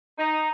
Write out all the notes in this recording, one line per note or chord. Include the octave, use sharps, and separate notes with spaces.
D#4